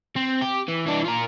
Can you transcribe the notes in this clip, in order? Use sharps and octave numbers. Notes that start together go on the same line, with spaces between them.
C4
G4
E3
E3 D4
F4 A#4